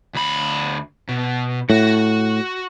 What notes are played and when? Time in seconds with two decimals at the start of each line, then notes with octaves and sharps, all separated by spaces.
0.14 D2 B5
1.09 B2
1.70 A2 F#4